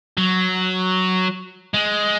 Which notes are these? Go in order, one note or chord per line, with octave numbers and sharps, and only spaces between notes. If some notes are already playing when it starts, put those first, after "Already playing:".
F#3
G#3